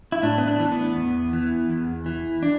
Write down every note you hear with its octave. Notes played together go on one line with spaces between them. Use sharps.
E4
A2 D4
B3
D4
E3
B3
E2
E3
E2
E3
D4